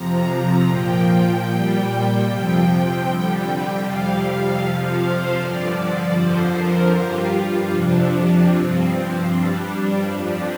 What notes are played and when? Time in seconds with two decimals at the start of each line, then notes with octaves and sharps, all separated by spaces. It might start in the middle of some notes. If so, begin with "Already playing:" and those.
Already playing: F2 C3 F3 A#5
0.66 A#2 F3 G5
1.45 A#2 G3
2.23 F2 C3 F3
3.00 F2 D3 G3 G5
3.78 F2 C3 G3 F5
4.56 F2 C3 F3 F5
4.96 C5
5.34 G2 D3 F3 D5
6.12 F2 D3 F3 C5
6.51 A#4
6.90 G2 G3 F4
7.68 F2 C3 F3 D4
8.45 G2 F3 C4
9.23 G2 G3 D4
9.62 D4
10.02 F2 F3 D4